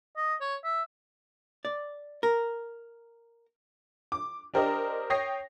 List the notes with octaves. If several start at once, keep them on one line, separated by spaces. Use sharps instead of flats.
D#5
C#5
E5
D5
A#4
D6
D4 G4 A#4 C5 D5 D#5
C#5 G5 D#6 A#6 C7